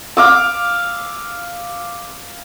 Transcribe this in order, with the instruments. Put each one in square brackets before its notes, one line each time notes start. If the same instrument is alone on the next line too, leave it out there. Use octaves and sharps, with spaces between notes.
[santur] F5 D6 E6